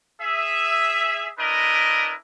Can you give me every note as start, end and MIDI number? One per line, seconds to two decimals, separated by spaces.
0.21 1.28 68
0.21 1.28 76
1.38 2.12 62
1.38 2.12 64
1.38 2.12 70
1.38 2.12 71
1.38 2.12 75